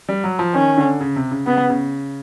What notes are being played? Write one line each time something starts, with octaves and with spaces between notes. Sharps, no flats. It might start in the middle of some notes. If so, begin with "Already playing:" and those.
G3
F#3
F3
D#3 C#4
D3
C#3
C3
C#3
C#3 B3
C#3